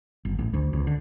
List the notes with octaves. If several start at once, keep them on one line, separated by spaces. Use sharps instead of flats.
G1
A1
D2
C#2
D3